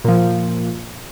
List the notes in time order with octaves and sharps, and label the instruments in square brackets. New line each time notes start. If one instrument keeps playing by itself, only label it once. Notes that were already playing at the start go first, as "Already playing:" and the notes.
[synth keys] A#2 F3